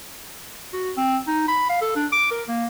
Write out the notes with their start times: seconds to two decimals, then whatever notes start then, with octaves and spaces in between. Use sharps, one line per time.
0.73 F#4
0.97 C4
1.27 D#4
1.48 B5
1.69 F5
1.81 A4
1.96 D4
2.12 D6
2.31 A#4
2.48 A#3